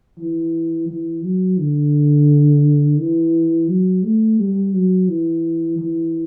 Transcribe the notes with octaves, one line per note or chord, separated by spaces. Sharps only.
E3
E3
F#3
D3
E3
F#3
A3
G3
F#3
E3
E3